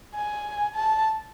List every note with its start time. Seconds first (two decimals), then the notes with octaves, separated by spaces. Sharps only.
0.14 G#5
0.75 A5